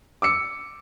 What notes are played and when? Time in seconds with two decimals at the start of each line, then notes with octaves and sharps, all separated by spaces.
0.22 D6 E6 C#7